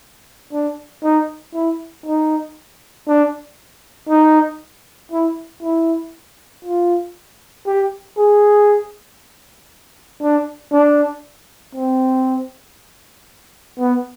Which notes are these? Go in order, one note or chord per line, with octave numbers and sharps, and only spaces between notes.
D4
D#4
E4
D#4
D4
D#4
E4
E4
F4
G4
G#4
D4
D4
C4
B3